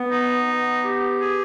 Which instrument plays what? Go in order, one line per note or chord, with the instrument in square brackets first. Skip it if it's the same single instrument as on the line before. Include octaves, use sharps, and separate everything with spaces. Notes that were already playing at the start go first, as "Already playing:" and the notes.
Already playing: [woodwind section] B3
D#4
B3
G4
G#4